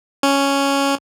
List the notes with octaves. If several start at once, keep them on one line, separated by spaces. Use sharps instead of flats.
C#4